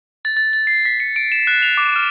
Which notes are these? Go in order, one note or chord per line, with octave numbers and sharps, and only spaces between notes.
A6
A6
A6
C7
B6
C#7
D7
E7
F#6
F7
D6
F6